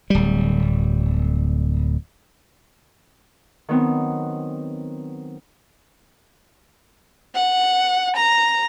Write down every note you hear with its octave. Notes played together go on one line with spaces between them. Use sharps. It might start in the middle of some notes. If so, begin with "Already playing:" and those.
D1 G3
D#3 F#3 B3 C4
F#5
A#5